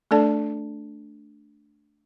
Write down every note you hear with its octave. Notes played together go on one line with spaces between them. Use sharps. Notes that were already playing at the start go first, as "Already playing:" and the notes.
A3 D4 A4 D5 A5